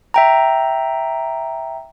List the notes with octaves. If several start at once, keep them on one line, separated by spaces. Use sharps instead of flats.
E5 G5 A#5